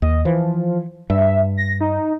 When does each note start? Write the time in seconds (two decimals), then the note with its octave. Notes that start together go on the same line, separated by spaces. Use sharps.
0.02 D#2 D#5
0.25 E3 F3
1.10 G2 E5
1.57 A#6
1.81 D#4